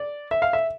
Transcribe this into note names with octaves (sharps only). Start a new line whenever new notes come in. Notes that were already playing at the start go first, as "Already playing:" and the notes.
Already playing: D5
E5
F5
E5